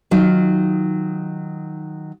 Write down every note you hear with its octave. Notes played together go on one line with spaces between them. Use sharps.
D#3 F#3 D#4 F4